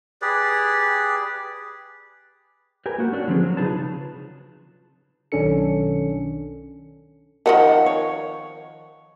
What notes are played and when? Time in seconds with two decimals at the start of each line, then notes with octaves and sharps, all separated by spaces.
0.22 G4 G#4 B4 D5
2.86 G4 A#4 B4 G#5
2.98 A#3 F#4
3.12 C#4 D4 F4 F#4
3.27 D3 F3 B3 C4 G#4
3.43 F#3
3.57 C#3 D#4 F4 G#4 B4 A5
5.32 B1 D#3 C#4 D4 A4 C#7
7.46 D#3 F3 G3 A#4 F#5
7.86 C#5